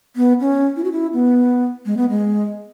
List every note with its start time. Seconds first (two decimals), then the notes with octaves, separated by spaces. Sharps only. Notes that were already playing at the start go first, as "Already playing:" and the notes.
0.16 B3
0.41 C#4
0.76 E4
0.84 F#4
0.92 E4
1.13 B3
1.86 G#3
1.97 B3
2.09 G#3